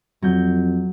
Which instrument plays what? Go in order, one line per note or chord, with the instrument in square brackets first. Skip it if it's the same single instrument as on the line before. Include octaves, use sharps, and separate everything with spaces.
[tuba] F2 [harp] F#3 G6